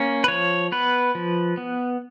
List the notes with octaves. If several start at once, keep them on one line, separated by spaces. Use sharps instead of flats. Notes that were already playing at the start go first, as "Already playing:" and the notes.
Already playing: A#3 C#4
B4
F3 C#5
B3 B4
F3
B3